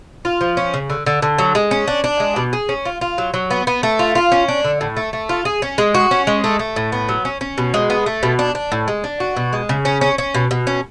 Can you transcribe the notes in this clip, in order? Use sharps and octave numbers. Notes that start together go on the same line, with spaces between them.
F4
F3
C#4
C#3
D3
D3
D3
F#3
G#3
C#4
D4
D4
G#3
B2
G#4
C#4
F4
F4
F#3
F#3
B3
B3
A3
F4
F4
C#4
D4
D3
A2
A3
A3
F4
G#4
C#4
G#3
F#4
C#4
G#3
A3
A3
A2
B3
F#3
C#4
C#4
B2
G#3
B3
A3
B2
D4
D4
A2
G#3
D4
F#4
B2
G#3
C#3
C#4
C#4
C#4
B2
B2
C#4